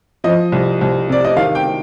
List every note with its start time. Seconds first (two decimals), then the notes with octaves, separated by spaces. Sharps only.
0.24 F3 D#5
0.52 C2
0.81 C2
1.09 C3 D5
1.24 D#5
1.36 D#3 F5
1.55 G5